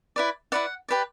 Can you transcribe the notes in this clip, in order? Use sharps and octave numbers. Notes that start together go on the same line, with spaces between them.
E4 B4 D5
E4 B4 D5 F#5
G4 B4 D5